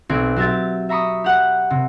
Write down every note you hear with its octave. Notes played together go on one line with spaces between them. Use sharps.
B1 C4 G#6 D7
F#3 C4 G4 E5 A6
E5 A#5 B5 C#6 D#6
G4 F#5
C3